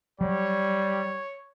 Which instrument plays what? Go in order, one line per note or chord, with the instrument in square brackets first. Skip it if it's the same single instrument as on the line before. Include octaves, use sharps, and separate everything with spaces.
[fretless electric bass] F#3 [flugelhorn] G3 [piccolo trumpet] C#5